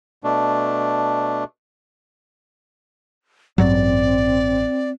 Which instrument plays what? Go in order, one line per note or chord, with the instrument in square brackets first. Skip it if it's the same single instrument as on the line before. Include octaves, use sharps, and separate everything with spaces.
[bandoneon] B2 A3 D4
[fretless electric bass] A1 G2 F#3 [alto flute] C4 [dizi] D5